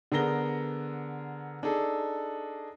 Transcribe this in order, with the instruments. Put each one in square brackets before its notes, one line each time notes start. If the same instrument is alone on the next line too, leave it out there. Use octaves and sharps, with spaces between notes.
[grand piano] D3 B3 G#4 A#4 A#6 G7
D4 D#4 G#4 A4